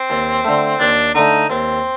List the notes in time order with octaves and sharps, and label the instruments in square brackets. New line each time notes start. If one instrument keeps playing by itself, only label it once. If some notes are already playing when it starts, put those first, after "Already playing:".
Already playing: [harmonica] C4
[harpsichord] D#2
D3 A3
[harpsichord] D#2 [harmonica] D4
[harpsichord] D3 A3 [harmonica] D#4
[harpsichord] D#2 [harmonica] C4